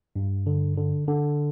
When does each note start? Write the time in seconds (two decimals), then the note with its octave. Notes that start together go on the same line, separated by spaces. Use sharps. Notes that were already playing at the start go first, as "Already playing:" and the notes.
0.16 G2
0.46 D3
0.77 D3
1.08 D3